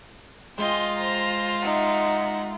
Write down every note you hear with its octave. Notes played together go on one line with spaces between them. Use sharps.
G#3 F4 D#5 G5
C5 A#5
D#4 E5 F#5